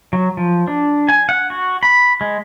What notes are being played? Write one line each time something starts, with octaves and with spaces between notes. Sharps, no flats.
F#3
F3
D4
G#5
F#5
F#4
B5
G#3